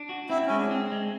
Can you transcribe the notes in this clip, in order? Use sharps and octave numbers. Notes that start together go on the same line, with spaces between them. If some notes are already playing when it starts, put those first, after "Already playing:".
Already playing: D4
F#4
C4 E4
G#3 C#4
D4
C4
G#3